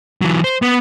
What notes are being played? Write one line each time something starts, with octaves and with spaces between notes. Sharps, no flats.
E3 F#3
C5
B3